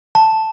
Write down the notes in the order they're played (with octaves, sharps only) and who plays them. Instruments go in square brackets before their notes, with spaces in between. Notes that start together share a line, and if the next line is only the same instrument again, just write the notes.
[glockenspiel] A5